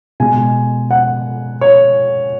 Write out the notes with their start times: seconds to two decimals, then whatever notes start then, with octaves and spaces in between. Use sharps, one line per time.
0.20 B2 G#3 G#5
0.91 F#5
1.61 C#5